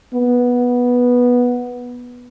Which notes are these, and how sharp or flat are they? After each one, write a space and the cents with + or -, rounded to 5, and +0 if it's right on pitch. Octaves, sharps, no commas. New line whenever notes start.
B3 -10